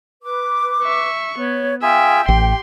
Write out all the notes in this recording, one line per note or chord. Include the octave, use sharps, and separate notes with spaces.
B4 D6
E5 C#6
B3 C#5
F4 G#4 E5 G5 G#5
A1 G4 C6